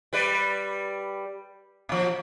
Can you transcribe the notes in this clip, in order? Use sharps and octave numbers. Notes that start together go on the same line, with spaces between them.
G3 B4 D5
A#2 F3